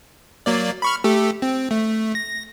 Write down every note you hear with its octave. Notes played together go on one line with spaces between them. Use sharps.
F#3 A#3 D5
B5 C#6 F6
A3 G4 A4
C4
A3
A#6